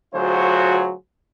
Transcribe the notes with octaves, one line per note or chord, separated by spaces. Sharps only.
D2 F#3 F4 F#4 G#4 C5